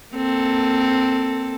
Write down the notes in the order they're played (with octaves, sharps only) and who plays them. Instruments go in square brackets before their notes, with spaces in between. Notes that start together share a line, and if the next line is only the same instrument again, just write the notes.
[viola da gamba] A#3 C4 A4